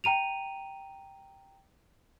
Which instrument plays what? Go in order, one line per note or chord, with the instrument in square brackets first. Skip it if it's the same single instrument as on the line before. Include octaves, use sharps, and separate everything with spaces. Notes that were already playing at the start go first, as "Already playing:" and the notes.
[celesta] G5 A#5 D#7 F7